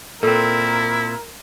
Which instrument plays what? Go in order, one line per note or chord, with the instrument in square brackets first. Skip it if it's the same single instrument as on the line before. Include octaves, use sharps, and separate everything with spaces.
[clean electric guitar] A#2 C4 [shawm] E4 [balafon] A4 [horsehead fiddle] A#4